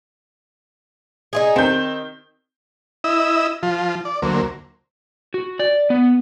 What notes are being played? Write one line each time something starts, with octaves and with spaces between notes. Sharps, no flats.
D#4 F4 G#4
D#3 C4 G6
E4 D#5 E6
F3 F4
D5
D2 F#3 A#3 C5
F#4
D5
B3